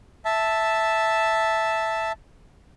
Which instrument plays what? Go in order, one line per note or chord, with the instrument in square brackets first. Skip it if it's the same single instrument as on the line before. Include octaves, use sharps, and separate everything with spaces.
[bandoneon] E5 A5